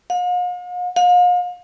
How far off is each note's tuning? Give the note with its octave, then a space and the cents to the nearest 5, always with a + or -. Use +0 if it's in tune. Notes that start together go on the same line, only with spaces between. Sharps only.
F5 +45
F5 +40